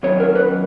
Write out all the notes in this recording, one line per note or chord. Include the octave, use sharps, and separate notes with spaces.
D#3 F#3 C#4 C#5
A#4
B4